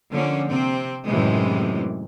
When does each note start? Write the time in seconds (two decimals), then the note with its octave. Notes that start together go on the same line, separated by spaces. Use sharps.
0.11 D3 F3 A#3 C#4
0.48 C3 C4
1.07 F#2 A2 C3 D#3 E3 G#3